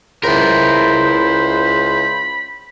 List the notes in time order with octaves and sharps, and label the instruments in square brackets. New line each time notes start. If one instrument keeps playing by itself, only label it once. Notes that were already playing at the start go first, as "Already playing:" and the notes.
[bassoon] C#2 [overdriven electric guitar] E4 A#4 [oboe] C5 [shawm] B5